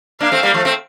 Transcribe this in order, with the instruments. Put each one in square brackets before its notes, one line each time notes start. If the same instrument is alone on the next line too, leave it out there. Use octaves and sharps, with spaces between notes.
[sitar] A#3 D4 [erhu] F5
[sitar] A3 C4
G3 A#3
F3 A3
A3 C4